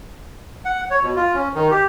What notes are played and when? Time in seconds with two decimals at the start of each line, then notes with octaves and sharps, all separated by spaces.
0.65 F#5
0.90 C#5
1.03 B2
1.16 F4
1.34 C#4
1.55 D#3
1.71 G4